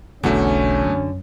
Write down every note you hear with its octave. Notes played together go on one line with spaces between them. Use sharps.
E1 B1 E2 D3 A3 C#4 F#4
F#2